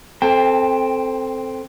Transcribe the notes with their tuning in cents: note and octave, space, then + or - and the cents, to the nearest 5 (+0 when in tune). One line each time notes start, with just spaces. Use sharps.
C4 +0 A4 +0 G5 +30